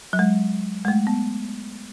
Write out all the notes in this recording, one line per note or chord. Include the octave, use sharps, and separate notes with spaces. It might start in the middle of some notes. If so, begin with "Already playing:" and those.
F#3
G#3
G#3
A3
B3